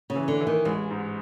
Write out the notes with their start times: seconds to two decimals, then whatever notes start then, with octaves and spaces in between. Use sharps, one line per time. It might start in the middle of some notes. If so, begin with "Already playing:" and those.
0.10 C#3
0.16 E3
0.28 D3
0.41 E3
0.47 D#3
0.65 A1 G#3
0.90 G#2